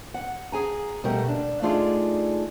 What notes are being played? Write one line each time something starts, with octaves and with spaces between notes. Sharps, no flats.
F#5
G#4 G#5 A#5
D2 B2 G3 A3 A#4
D4
A3 D4 D#4 F4 G#4 D5